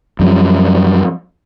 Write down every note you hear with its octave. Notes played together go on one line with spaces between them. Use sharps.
F#2 F3 G3